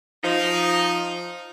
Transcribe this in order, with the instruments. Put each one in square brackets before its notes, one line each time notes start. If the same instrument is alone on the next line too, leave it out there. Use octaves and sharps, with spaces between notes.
[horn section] F3 D#4